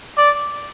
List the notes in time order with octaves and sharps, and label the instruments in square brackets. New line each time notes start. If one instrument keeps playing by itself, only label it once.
[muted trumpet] D5